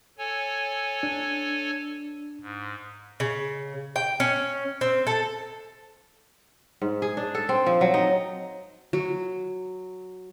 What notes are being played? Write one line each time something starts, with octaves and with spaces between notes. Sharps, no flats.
A4 C#5 G#5
D4
G#2
C#3
G5
C#4
C4
A4
G#2
G#4
D4
A4
C4
F3
F#3
D#4
F#3